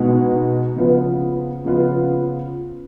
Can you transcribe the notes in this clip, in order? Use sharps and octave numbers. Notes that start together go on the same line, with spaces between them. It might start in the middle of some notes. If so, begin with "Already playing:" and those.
Already playing: B2 G#3 B3 D#4
C#3 F3 B3 F4 B4
C#3 F3 B3 F4 B4